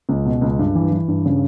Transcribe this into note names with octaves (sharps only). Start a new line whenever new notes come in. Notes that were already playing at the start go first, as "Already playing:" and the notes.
C#2
B2
C#2
G2
E3
E3
G2
C#3